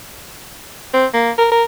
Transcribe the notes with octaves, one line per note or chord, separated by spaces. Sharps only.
C4
A#3
A#4
A#4